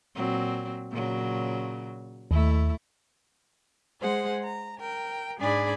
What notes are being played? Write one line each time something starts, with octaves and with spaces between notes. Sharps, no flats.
A#2 F#3 C4
A#2 C#3 F#3
D#2 A3 E4
G#3 G#4 C5 F#5
A#5
A#4 G5
G#2 D4 G#4 D5 G#5 B5